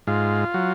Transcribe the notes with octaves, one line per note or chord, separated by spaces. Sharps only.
G#2 F4
F#3